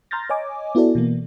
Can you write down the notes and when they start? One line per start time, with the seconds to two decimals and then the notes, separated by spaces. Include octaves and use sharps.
0.11 A#5 C6 F6 G6 A6 A#6
0.30 C#5 D#5 G#5 D6
0.75 B3 E4 F#4 A4 D5
0.95 B2 E3 A#3